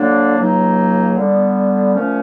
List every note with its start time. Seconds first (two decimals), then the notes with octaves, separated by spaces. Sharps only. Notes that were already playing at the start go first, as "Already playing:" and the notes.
Already playing: D3 F#3 A#3 D4
0.37 C#2 C#3 F#3 A#3 D#4
1.16 D3 G3 B3
1.94 A#2 F3 A3 C#4